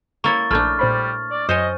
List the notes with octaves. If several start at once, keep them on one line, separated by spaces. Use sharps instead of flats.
A#3 E4 C#5 C#6 A6
A#1 A3 D4 B5 F6 G6
A#2 G3 C5 B5
D5
F#2 C5 C#5 D#5 G#5